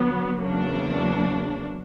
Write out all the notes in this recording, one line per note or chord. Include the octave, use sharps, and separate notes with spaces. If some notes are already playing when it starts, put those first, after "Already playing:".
Already playing: D3 F#3 B3
E2 C#3 F#3 A#3 D4